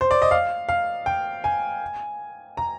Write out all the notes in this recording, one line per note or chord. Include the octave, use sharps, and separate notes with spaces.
C5
D5
D#5
F5
F5
G5
G#5
A#5